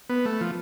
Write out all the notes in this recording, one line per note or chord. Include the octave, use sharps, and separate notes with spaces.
B3
A3
F3